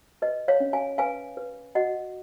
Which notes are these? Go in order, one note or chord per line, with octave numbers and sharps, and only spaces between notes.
B4 D#5
C#5 F5
C#4
F5 G#5
B4 F5 G#5
B4
F#4 D#5 F#5